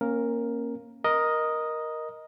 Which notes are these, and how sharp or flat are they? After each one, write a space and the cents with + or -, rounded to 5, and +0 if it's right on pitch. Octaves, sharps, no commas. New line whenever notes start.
A#3 +5 C#4 -25 A#4 +0
A#4 +10 D#5 +0